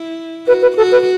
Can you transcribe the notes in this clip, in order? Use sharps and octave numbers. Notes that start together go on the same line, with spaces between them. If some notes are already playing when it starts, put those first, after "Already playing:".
Already playing: E4
F#4 B4
B4
F#4 A4
B4